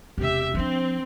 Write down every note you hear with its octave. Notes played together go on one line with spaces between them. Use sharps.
E1 C3 G4 E5
F3 C4 D4